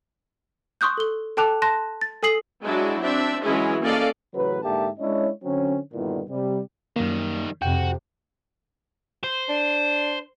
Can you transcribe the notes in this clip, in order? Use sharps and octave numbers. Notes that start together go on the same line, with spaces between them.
C6 C#6 D#6 F#6 G6
A4 G7
A4 G5 A5 D6 F#6 F7
A5 C6 F#6 A#6
A6
A4 G#5 D#6 C7 F#7
F#3 G#3 D4 E4 F#4
C4 D4 E5
E3 F#3 G#3 C#4 E4 G#4
A#3 C#4 A4 D5 D#5 F5
A1 C#3 F#3 B4
G#2 D3 A#3 G4 E5 A5
G#3 C#4 D4 E4 C#5 D#5
D3 F#3 C4 C#4
G2 A#2 D3 D#3 B3 E4
C3 G3
F#2 D#3 G3 A#3
F2 C3 F#4 G5
C5
D4